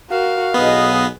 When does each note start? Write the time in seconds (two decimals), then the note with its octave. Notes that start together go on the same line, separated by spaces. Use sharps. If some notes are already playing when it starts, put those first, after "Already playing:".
0.10 F#4 A#4 F5
0.54 B1 B3 G#4 B4 D#5